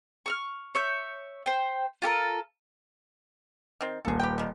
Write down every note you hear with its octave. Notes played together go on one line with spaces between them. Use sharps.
C#6 E6 F6
C#5 E5 G6
C5 G5
F4 G4 A4 A#4
D#3 C4
D#1 A#3 G#4 A4
G4 B4 G5
D#3 G3